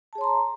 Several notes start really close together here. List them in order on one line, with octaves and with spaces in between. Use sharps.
A5 G#4 C#5 C6 A#5